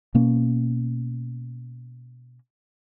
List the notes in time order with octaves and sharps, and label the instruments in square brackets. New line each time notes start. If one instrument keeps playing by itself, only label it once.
[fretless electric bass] B2 A#3 C#4